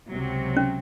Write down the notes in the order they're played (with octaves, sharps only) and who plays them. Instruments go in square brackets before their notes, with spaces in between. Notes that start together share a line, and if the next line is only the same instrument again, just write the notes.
[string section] C#2 C3 F#3
[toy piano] C#4